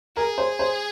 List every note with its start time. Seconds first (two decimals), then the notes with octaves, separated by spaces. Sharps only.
0.17 G#4 A#4
0.38 C5
0.59 C5